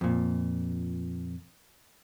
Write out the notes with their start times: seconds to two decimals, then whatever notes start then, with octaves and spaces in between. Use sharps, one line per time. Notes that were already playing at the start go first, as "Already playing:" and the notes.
0.01 F2 A#2